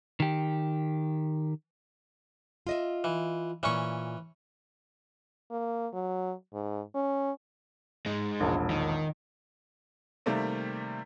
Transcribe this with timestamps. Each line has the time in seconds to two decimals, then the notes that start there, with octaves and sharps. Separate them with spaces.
0.20 D#3 G4
2.67 F4 D#5 E5
3.04 E3
3.63 A#2 E3 C#4 D5 C#6
5.51 A#3
5.93 F#3
6.53 G#2
6.95 C#4
8.06 G#3 D#4
8.40 E1 A#1
8.70 D#3
10.26 C3 D#3 G3 A3 A#3 C4